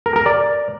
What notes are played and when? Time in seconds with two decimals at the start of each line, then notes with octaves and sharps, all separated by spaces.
0.06 A#4
0.16 A#4
0.26 D5